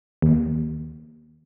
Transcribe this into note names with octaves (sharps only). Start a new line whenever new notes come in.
D#2